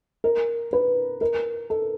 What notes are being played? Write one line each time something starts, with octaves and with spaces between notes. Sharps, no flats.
A#4
B4
A#4
A4